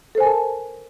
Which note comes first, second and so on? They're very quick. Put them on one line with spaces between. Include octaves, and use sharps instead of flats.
A4 C5 G#5 A#4 A5